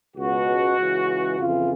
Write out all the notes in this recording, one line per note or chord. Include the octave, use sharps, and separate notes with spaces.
C#2 B2 F#4
C#2 C#3 E3
F2 C#3 E3 F4